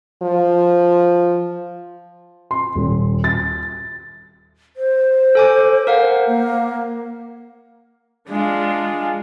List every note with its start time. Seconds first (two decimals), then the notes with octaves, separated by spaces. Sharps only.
0.22 F3
2.51 C6
2.75 D#1
3.24 A6
4.76 C5
5.35 A4 G#5 D6
5.87 A#4 F5 F#5
6.26 A#3
8.29 G#3 D4 F4